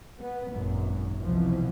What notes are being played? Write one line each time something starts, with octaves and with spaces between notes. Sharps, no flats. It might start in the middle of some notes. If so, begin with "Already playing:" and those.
B3
G#1 F#2 A#2
C2 B2 E3 F3